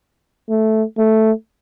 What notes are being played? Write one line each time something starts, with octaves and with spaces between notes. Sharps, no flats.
A3
A3